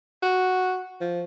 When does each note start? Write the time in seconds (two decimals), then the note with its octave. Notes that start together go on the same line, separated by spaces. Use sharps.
0.23 F#4
1.01 F3